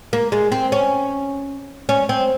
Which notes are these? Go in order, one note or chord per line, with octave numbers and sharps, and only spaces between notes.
A#3
G#3
C4
C#4
C#4
C4